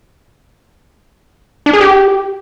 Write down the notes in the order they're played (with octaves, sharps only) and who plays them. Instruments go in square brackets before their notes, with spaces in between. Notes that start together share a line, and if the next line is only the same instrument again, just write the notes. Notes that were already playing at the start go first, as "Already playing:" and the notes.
[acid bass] D4
G#4
G4